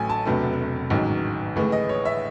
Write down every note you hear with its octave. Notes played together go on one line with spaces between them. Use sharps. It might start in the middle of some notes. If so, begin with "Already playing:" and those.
Already playing: A1 A2 F#3 A3 G#5
A5
E1 E2 C3 F#3 A3
A1 G#2 D#3 F#3
A1 A2 E3 G#3
D#5
C#5
E5